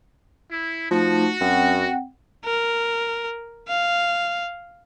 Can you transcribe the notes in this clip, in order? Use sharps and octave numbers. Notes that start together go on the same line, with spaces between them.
E4
F3 A3 D#4 F#4 A5
F#2 C4 F#5 G5
A#4
F5